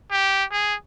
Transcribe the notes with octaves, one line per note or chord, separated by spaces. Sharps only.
G4
G#4